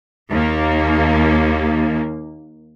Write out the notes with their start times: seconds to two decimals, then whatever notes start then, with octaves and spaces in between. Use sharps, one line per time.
0.30 D#2 A#3